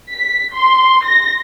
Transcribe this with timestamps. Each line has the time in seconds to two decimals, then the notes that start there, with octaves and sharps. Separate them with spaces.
0.13 B6
0.56 C6
1.06 A#6